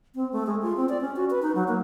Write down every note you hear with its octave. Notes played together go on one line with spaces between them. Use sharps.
C4
A3
G#3
F4
C4
D5
C#4
F#4
B4
D#4
F#3
A#3